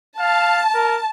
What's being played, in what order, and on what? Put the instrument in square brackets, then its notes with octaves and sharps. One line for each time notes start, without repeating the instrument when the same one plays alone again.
[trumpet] F5 [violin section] A5
[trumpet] A#4